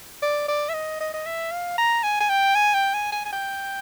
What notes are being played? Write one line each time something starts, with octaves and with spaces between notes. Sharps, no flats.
D5
D5
E5
D#5
D#5
D#5
E5
F5
A#5
G#5
G#5
G5
G#5
G5
G#5
G#5
G#5
G5